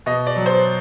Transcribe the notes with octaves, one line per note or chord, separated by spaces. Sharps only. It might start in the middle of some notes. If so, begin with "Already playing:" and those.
B2 D#5
D5
F#3
C5